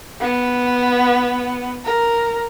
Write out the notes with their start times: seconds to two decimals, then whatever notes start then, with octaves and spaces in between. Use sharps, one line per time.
0.20 B3
1.84 A#4